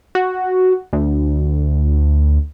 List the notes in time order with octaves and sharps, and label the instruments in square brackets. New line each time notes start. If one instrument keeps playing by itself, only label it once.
[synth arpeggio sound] F#4
D2